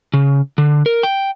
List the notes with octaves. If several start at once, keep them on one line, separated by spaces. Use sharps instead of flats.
C#3
D3
A#4
G5